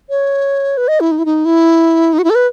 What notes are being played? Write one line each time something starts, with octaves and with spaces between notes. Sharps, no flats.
C#5
B4
D#5
E4
D#4
E4
D#4
E4
D#4
F#4
E4
A4
B4